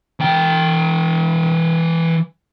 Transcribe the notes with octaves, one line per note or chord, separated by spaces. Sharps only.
E3 G5